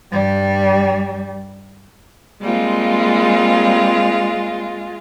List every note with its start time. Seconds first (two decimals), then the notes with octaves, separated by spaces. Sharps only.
0.12 G2 G3
2.41 G3 G#3 A#3 C4 F4